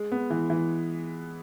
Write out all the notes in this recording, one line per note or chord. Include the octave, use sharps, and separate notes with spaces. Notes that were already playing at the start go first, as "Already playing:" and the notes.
Already playing: G#3
B3
E3
E3